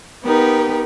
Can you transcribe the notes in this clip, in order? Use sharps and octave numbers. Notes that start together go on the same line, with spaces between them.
B3 D#4 G4 A#4